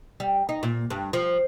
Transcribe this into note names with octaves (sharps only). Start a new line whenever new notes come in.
G3
D#4
A#2
G2
F3